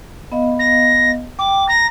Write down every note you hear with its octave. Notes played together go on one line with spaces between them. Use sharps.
B3 D#5 F5
A#6
G5 D6
A#5 A#6